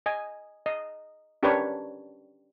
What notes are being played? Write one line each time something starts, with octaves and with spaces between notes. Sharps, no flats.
D#5 G#5
D#5
C#4 D4 G4 A#4 B4 C#5